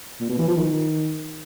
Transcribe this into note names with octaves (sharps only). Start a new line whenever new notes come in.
A#2
B2
E3
F3
D#3